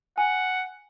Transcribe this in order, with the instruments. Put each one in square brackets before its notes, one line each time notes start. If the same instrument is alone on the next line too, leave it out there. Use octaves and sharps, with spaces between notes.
[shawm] F#5 [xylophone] G#5